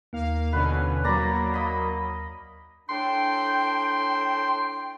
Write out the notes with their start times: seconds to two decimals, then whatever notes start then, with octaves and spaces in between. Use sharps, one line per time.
0.13 D#2 A#3 F5
0.52 B2 D3 C#4 B4
1.04 F#3 A#3 D5 A#5 B5
1.54 D#5 B5
2.89 A2 D4 G5 C6